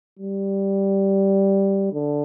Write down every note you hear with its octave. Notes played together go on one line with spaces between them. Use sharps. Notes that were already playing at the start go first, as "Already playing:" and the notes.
G3
D3